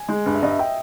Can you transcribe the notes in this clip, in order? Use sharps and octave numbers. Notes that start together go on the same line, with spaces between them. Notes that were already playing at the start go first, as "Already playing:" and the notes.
Already playing: G#5
G#3
G2
E5
G2 D#5
E5
G5